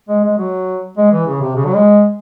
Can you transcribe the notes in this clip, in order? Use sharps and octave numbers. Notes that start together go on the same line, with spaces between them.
G#3
G#3
F#3
G#3
E3
C#3
C3
C#3
F#3
G#3